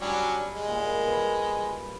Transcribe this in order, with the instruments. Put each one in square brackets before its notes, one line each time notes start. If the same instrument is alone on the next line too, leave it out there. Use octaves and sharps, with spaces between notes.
[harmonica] F#3 C#4 D4 [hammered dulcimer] G3
[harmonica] G#3
[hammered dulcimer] A#2
B4 F5